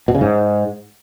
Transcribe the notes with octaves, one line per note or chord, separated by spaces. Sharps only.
B2
C#3
G#2